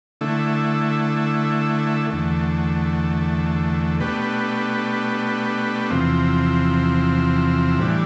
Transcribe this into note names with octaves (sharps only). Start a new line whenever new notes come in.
D3 A3 E4
E2 D3 A3
B2 A3 D4 G4 B4
E2 C3 F3 C4
A2 E3 G3 D4